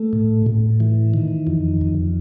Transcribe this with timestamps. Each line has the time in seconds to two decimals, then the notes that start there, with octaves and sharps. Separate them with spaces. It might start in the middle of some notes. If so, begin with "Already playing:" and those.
Already playing: A3
0.13 A2
0.46 A2
0.80 E3
1.14 D#3
1.47 F2
1.81 F2